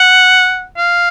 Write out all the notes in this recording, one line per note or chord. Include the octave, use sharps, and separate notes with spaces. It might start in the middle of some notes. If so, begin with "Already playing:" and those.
Already playing: F#5
F5